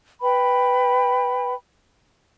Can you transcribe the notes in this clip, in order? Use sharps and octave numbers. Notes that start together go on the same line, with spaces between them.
B4 G5 B5